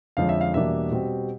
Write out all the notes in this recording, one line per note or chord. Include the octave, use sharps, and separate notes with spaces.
F2 D3 F3 G#3 C#4 F5
E5
F5
E2 B2 G3 A#3 D4 E5
B2 G3 C4